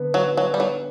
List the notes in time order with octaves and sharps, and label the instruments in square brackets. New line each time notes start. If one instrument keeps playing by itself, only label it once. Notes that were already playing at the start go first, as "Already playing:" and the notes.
Already playing: [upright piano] D3 B3
[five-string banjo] F#3
F#3
G3
F#3